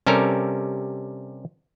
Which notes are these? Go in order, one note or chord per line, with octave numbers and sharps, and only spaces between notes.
C3 G3 C#4 A4 A#4